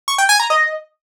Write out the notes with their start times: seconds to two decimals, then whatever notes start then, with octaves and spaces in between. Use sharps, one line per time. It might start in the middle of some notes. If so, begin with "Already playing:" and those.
0.08 C#6
0.18 G5
0.29 G#5
0.40 A#5
0.50 D#5